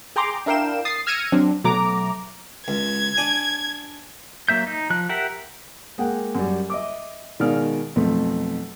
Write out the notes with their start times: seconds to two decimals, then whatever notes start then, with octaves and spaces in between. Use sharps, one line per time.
0.16 G#4 G5 A#5 C6 D6
0.46 D4 E4 A#4 F5 G5 E7
0.85 D#6 A6 C7
1.06 E6 F6 G#6 A#6 C#7 D#7
1.32 F#3 C4 D4
1.64 B2 F#3 A3 A#5 D6
2.68 C#2 G#6
3.17 D4 G#5
4.49 F#3 A#3 E5 G6
4.67 D#4
4.90 F3 F#6
5.09 G4 A#4 E5 F#5
5.98 G#3 A#3 F#5 G5
6.35 F#2 G3
6.70 D#5 E5 D6
7.40 B2 D#3 G#3 D5 F5 F6
7.96 B1 F2 A3